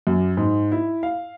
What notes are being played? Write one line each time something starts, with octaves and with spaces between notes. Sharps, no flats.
F#2
G#2
E4
F5